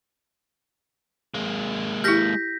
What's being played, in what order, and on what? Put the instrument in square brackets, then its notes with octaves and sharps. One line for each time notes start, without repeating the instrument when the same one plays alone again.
[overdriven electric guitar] G#3 A#3
[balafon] E4 G4 [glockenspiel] G6 A#6 B6